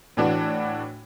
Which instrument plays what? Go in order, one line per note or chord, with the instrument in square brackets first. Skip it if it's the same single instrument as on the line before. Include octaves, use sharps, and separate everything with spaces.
[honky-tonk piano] A2 E3 D4 F#4